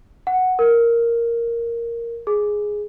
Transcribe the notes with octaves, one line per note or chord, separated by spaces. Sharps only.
F#5
A#4
G#4